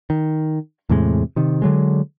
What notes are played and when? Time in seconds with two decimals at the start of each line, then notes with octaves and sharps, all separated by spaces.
0.10 D#3
0.89 E2 A2 C3 G#3
1.36 C3 D#3
1.62 D3 F#3 G#3